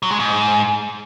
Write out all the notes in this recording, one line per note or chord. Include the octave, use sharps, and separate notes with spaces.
F#3
G#3
G#2